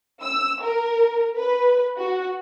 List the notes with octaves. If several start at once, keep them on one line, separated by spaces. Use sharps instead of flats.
E6
A#4
B4
F#4